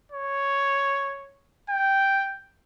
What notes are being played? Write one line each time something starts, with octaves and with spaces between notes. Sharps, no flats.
C#5
G5